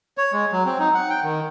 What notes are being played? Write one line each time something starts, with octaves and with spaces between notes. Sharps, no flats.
C#5
G#3
F#3
C4
D#4
F#5
G5
D#3